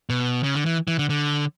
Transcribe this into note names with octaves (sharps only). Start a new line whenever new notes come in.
B2
C#3
D3
E3
E3
D3
D3